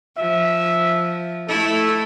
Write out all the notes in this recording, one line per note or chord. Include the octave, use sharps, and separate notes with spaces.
F3 E5
A3 E4 A4